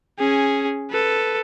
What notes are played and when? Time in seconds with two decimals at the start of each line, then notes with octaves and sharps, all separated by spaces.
0.19 C#4 G#4
0.90 A4 B4